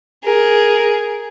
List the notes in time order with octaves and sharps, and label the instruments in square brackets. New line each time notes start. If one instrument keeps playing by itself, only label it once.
[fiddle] G#4 [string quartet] A#4